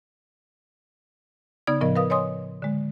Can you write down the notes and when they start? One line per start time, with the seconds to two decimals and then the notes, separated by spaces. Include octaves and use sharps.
1.67 C#3 B3 D#4 D5 G#6
1.81 A2 C#3 F3 B3 A#4 D#5
1.96 A#4 B4 F5 D#6
2.10 C#5 D#5 G#5 C6 D#6
2.62 D3 G#3